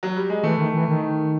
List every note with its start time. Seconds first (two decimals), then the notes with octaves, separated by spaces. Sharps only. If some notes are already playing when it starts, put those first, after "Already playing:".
0.03 F#3
0.16 G3
0.30 G#3
0.43 E3 A3
0.58 D#3
0.74 E3
0.88 D#3